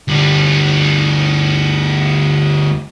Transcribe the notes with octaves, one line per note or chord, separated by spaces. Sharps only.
D2 G3